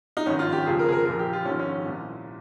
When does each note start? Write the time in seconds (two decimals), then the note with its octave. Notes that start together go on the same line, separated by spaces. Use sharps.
0.17 D#4
0.26 G#1 G2 D#3 C#4
0.39 F4
0.52 G4
0.65 F1 F2 C#3 F3 G#4
0.79 A#4
0.88 G#4
0.92 A#4
1.05 A#1 A#2 F3 A#4
1.19 G4
1.33 F4
1.45 A#1 G#2 D#3 C#4
1.59 C#4
1.85 C2 A#2 F3